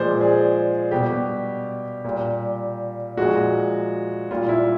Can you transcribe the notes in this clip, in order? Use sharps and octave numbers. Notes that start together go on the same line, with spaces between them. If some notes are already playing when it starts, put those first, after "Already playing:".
Already playing: A#2 F3 G#3 C5 D5
G#4
B2 G3 G4
A#2 G3
A#2 F3 G#3 F#4
A#2 G3 F4
E4